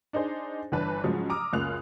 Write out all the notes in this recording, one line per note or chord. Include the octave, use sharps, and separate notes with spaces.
D4 D#4 G#4 C5
G1 E3 D4 B4 A5
G#2 C#3 F3 F#3
A#5 D6 D#6 F6
C#2 F#2 A#3 F4 F#6 F7